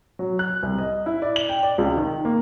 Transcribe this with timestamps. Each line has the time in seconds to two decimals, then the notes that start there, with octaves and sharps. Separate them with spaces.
0.19 F#3
0.39 F#6
0.63 C2
0.78 D#5
1.06 E4
1.22 D5
1.36 F#7
1.49 G5
1.63 D5
1.78 C#2
1.97 D#3
2.25 A#3